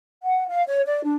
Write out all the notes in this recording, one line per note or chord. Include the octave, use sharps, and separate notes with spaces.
F#5
F5
C#5
D5
D4